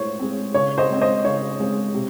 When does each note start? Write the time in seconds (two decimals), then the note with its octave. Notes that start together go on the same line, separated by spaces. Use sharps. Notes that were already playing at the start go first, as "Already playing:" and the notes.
Already playing: A2 G#3 C5 C#5
0.20 G#3 C4
0.54 C#3 C#5
0.78 C5 D#5
0.90 G#3 C4
1.01 C5 D#5
1.25 C#3 C#5
1.60 G#3 C4
1.94 C3